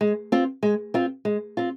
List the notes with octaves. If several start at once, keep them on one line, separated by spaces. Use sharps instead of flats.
G#3
C4 F4
G#3
C4 F4
G#3
C4 F4